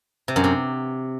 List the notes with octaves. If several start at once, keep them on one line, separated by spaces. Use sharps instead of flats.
C3
F#2
C3